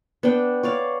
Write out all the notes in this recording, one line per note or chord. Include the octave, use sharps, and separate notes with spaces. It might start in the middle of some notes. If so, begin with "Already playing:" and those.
B3 D4 G5
C#5 D5 F5